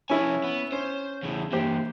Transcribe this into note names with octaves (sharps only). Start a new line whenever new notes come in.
F3 C#4 E4 G#5
B3
C#4 C5
E2 A2
E3 A#3 G4 C5